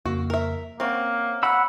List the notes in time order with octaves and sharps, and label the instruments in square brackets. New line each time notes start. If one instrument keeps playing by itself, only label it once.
[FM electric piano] F2 C#3 A#3 [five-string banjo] F#4
[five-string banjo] A#4 E5
[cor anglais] A#3 [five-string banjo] C4 C#4 [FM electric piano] E5 F#5
[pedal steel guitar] F#5 B5 E6 [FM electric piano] A#5 C#6